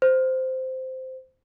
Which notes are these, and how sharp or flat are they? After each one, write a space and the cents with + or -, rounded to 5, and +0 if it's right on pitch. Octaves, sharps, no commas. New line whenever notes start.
C5 -10